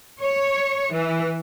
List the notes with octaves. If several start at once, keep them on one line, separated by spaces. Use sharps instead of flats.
C#5
E3